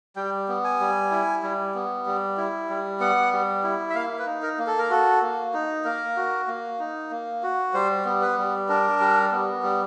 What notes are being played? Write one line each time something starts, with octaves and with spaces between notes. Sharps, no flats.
G3 G5
B3
G#5
G3
E4
G3
B3
G3
E4
G3
B3 F#5
G3
E4
E5
A#3 F5
B4
D#4
A#4
A#3
A4
A#4
F#4 A4
A#3
D#4
A#3 A#4
F#4
A#3
D#4
A#3
F#4
G3 C5
B3
B4
G3
D4 A#4
G3
B3
G3